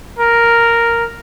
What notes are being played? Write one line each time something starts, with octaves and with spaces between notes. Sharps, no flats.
A#4